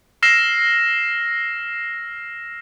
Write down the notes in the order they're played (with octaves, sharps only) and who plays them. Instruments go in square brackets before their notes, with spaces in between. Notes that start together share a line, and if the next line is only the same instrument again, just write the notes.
[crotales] E6 F6 A#6 C7 E7